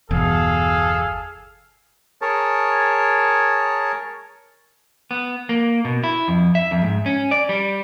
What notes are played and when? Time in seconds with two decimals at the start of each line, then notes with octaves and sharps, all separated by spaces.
0.11 G1 E2 B2 G#4 A4 F5
2.22 G#4 A#4 C#5 A5
5.11 B3
5.49 A#3
5.85 B2
6.04 E4
6.28 F2
6.55 E5
6.71 F2
6.83 G#2
7.06 C#4
7.31 D5
7.49 G3